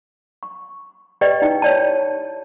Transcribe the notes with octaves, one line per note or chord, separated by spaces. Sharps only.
C#6
G4 B4 D5 D#5 G5
D#4 E4 G5
C#5 D5 A5